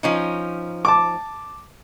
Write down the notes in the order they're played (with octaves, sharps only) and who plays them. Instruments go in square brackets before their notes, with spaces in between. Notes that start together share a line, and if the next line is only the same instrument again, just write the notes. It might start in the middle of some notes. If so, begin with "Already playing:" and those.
[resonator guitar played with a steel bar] F3 C#4 D#4
[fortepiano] A5 D6